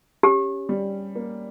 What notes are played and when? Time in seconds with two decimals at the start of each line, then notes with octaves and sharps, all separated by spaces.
0.23 C#4 G4
0.69 G3
1.16 A#3